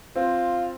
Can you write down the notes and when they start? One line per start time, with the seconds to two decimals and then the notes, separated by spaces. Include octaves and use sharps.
0.16 C4 F4